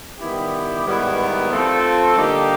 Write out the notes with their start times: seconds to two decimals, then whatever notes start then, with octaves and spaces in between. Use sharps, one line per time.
0.19 D#3 G3 B3 E4 G4
0.85 G#2 D#3 G3 B3 E4
1.51 F3 A3 C4 F4 A4
2.16 D3 G3 A#3 D#4 G4